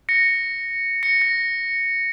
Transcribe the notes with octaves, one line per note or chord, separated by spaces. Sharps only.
A#6 C#7
A#6 C#7
A#6